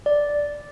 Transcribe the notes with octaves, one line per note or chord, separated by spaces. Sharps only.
D5